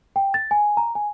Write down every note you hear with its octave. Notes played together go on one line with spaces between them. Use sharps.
G5
A6
G#5
A#5
G#5